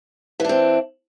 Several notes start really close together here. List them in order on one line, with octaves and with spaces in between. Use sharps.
E3 D4 C4